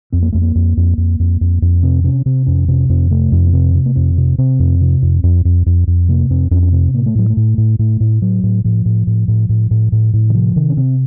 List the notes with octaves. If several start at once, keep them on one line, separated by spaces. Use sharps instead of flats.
F2 C4
A#3
F2 A3
A#3
F2
F2
F2
F2
F2
F2
C3 C4
C3 C#4
C3 C4
F2 C#4
C3 C#4
F2 C4
C3 A3
F2
A#3
C3 C4
C3
A#3
F2 C4
C3
C3 C4
F2
C3
F2
F2
F2
F2
F2
C3 A#3
F2 C4
F2 C#4
C#4
C3 C4
A2 A#3
A3
A2 F#3
A3
A2
A2
A2 A3
A2
A2 F#3
A2
A2 F3
A2
A2
A2
A2
A2
A2
A2
D#3
C3 F3
C3 D#3
C#4
C3 C4